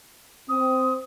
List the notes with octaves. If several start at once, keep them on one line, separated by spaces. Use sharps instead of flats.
C4 D#6